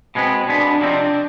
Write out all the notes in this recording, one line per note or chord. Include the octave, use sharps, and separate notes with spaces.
B2 G#3 B3 C4
B2 G#3 B3 D4
C3 F3 G#3 C4 D4 D#4